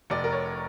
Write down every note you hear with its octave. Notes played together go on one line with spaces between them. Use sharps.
F1 D5
A#4
C#5